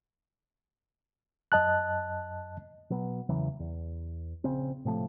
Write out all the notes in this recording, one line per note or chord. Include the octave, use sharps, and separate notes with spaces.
F#2 D#5 A5 F#6
B2 F#3 B3
E2 C#3 E3 F#3
E2
A#1 C#3 C4
A2 C3 F3 A3